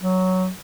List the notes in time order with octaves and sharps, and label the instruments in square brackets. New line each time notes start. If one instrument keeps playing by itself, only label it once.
[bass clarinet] F#3